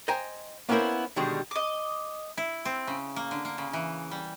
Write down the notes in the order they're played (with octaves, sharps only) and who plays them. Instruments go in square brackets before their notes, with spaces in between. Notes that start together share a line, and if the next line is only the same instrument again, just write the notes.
[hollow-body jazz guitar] C5 D#5 G5 G#5 A#5
A#3 B3 C#4 E4 A#4 C5
B2 D3 D#3 G3 G#3
[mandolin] D#5 D6
[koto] E4
C4
C#3
A#3
D3
A#3
C#3
E3
G3